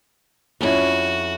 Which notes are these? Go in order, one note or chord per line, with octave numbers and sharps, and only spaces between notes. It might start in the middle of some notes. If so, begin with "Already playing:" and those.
F2 C#4 E4 F#4